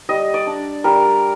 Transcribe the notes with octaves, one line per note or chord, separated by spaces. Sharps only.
G3 D#5
D5
D4
G3 A#4